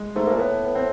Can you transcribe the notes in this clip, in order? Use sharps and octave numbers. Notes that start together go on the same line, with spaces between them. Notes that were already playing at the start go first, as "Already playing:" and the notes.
Already playing: G#3
G#2 A3
A#3
A#2
A2 B3
B3
C4